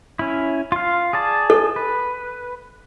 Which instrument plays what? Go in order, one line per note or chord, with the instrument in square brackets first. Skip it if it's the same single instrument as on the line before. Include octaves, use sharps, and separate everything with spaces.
[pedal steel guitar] C#4 E4
F4 F5
G#4 D5 A5
[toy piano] A4
[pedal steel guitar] B4